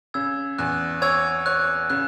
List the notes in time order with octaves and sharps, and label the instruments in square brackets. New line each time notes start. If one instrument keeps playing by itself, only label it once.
[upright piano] C#3 [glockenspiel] E6 G#6
[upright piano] E2 [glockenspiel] F#6
[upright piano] C#5 [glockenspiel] E6 G#6
[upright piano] C#5 [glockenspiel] F#6
[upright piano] C#3 [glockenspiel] F#6